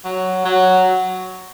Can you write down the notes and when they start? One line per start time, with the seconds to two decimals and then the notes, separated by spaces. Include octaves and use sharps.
0.05 F#3
0.45 F#3